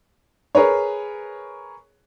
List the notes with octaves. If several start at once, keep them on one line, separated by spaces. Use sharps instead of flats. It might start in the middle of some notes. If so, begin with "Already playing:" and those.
G#4 A#4 B4 C#5